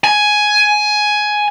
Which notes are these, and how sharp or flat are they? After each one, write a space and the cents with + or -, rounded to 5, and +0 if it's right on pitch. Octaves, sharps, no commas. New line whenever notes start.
G#5 +10